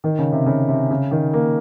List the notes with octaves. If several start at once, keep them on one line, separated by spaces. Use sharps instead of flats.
D#3
C#3
C3
C#3
C3
C#3
D#3
A#3